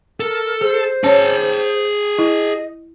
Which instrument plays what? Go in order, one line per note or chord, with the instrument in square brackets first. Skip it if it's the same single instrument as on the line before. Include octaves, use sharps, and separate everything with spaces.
[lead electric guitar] A4 [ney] A#4
[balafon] G#4 [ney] C5
[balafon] C#4 C#5 [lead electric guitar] G#4 A5
[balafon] E4 [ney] D#5